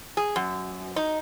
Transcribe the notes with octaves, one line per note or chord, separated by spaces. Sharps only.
G#4
F#2
D#4